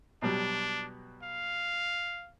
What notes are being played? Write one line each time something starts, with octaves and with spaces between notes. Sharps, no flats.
B2 F#3 G3 D4
F5